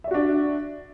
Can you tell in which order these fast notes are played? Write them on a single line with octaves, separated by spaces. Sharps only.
E5 D5 F#4 D4